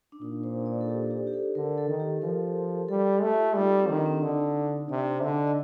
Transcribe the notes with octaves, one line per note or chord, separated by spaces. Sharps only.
D4
A#2 D#4
C5
D5
A4
G4
G4
G4
A4
D3 A#4
A4
D#3
G4
F3 A#4
G3 A4
G4
A3
F4
G3 D#4
C4
D#3 D4
C4
D4
D3 D#4
C3 D5
D3 D#5
D#5